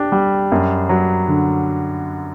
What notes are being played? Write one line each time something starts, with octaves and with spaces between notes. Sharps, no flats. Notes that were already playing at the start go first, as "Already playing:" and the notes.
Already playing: D4 G4
G3
F#2
F#3
D3